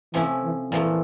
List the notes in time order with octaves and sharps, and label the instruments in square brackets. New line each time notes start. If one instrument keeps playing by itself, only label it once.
[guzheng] C3 F3 A3 C#4 E4 [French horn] E3
[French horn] E3
[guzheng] A#2 F3 A3 [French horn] E3